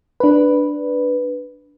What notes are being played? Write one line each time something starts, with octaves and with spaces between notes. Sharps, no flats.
D4 B4